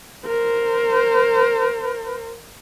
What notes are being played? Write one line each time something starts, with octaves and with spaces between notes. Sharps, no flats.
A#4 C5